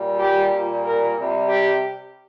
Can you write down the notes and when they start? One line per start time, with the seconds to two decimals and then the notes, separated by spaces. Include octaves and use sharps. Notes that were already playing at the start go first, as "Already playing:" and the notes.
Already playing: A#2 G3
0.19 G4
0.51 A#2 G3
0.84 A#4
1.15 C3 G3
1.48 G4